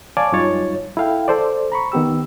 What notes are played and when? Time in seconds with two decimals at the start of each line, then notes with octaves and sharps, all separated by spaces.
0.17 C#5 D5 F5 G#5 A5 D6
0.32 F#2 G3 D#4 F4 C#5 A6
0.97 E4 A4 F5 G5
1.28 A4 C5 D5
1.72 A#5 B5 C#6
1.92 D#3 B3 G4 E6